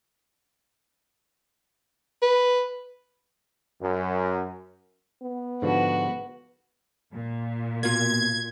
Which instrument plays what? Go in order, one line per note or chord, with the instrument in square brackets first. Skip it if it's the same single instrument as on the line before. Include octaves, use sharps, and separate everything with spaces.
[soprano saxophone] B4
[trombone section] F#2
[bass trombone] B3
[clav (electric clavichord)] G#2 D3 F3 [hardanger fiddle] F#4 B4
[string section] A#2
[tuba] B2 [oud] A#3 F4 [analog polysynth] G#6